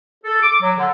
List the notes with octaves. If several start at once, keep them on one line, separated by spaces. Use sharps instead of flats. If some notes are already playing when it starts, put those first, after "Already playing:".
A4
D6
F#3
D3